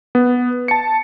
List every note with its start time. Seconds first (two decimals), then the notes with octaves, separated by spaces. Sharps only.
0.15 B3
0.68 A5 C#7